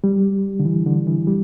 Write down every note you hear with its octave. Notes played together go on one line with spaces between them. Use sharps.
G3
D3
E3
D3
E3
G3